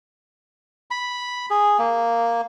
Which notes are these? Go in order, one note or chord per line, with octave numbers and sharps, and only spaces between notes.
B5
G#4
A#3